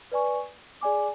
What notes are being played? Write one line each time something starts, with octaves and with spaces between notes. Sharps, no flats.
B4 D5 G#5 C#6
G#4 D5 G#5 D6